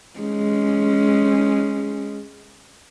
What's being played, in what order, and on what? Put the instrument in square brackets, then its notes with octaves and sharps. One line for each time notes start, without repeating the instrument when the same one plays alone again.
[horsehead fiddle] G#3 C#4